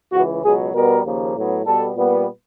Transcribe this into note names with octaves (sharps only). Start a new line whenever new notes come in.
C#2 C#3 E3 F#4
C#2 B2 F#3 G#4
B2 G3 B3 A#4
D#2 C#3 F3 A#3
A2 F#3 B3
B2 G3 B3 A4
A#2 G3 B3